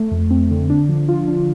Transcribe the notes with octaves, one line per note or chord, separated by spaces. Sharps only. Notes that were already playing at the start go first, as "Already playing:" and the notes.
Already playing: A3
F2
C4
D3
D4
F3
F4
D4